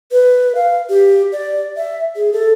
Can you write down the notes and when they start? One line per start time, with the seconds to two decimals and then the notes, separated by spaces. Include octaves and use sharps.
0.12 B4
0.55 F5
0.89 G4
1.32 D5
1.77 E5
2.16 G#4
2.33 A4